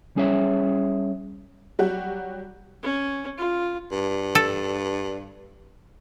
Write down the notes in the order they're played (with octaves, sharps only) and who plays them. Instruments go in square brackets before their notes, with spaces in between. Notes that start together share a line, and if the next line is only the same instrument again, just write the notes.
[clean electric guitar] G3 C#4 G#4 C#5 E5
[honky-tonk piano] F#3 G3 F#4 G4
[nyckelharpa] C#4
F4
[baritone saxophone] G2
[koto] A4